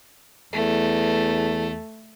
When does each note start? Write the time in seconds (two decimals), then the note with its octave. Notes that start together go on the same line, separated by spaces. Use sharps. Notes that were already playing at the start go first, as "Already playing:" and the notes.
0.53 E2 A3